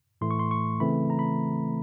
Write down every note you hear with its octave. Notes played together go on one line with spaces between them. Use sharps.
A2 E3 A3 C6
C#6
C6
C#6
C#3 E3 A3 C4 B5
A#5
B5